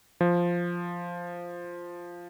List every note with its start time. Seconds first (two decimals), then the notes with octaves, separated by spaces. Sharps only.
0.21 F3